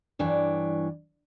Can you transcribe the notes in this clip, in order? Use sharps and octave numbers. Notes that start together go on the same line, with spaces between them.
G2 E3 D4 C#5